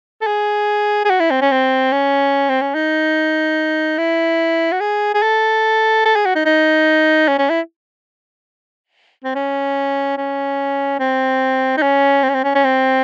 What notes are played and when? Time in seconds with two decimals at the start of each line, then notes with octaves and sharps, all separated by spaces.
0.22 A4
0.27 G#4
1.05 G#4
1.10 F#4
1.20 E4
1.31 C4
1.41 C#4
1.52 C4
1.92 C#4
2.49 C4
2.62 C#4
2.75 D#4
3.98 E4
4.72 F#4
4.81 G#4
5.14 G#4
5.23 A4
6.05 A4
6.16 G#4
6.26 F#4
6.36 D#4
6.46 D#4
7.28 C#4
7.39 C#4
7.50 E4
9.24 C4
9.35 C#4
10.17 C#4
11.00 C4
11.77 D#4
11.82 C#4
12.23 C4
12.29 C#4
12.35 C4
12.44 C#4
12.55 C#4
12.65 C4